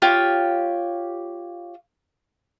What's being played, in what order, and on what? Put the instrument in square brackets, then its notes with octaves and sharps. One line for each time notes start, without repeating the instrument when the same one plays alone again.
[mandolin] F4 G4 C#5